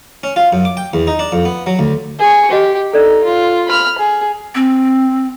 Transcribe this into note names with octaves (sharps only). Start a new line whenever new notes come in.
C#4
F4
F#2
D6
G5
E2
D#4
D4
F2
B3
F#3
D2
G#4 C#6
F#4 G4 D#5
D#4 A4 D5
F4
B5 F6
G#4
C4